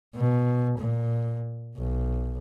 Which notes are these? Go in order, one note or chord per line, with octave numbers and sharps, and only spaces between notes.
B2
A#2
B1